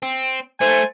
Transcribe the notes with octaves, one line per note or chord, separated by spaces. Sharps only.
C4
A3 C5 G#5